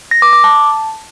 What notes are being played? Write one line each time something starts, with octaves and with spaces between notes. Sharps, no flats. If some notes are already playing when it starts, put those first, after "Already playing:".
A#6
D6
D6
A5